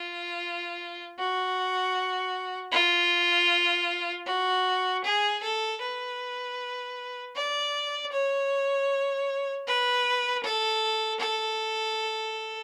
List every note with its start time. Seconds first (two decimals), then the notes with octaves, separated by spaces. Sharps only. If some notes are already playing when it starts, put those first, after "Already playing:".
Already playing: F4
1.19 F#4
2.72 F4
4.27 F#4
5.04 G#4
5.43 A4
5.81 B4
7.36 D5
8.12 C#5
9.67 B4
10.44 A4
11.20 A4